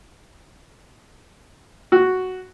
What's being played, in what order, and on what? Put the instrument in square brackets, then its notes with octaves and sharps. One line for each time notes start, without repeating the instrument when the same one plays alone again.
[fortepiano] F#4